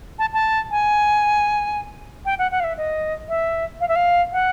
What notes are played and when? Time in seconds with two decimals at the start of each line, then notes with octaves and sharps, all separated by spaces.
0.19 A5
0.33 A5
0.71 G#5
2.25 G5
2.39 F#5
2.51 F#5
2.60 F5
2.64 E5
2.78 D#5
3.29 E5
3.81 F5
3.88 E5
3.96 F5
4.33 F#5